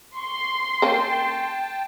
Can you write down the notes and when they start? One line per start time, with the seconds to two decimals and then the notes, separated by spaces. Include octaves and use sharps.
0.16 C6 C#6
0.82 A#3 C#4 G5 A5